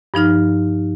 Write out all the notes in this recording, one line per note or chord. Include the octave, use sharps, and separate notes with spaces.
G2 F3 D#4 F6